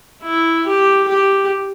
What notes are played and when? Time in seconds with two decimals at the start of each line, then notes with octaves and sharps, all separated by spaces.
0.22 E4
0.66 G4
1.08 G4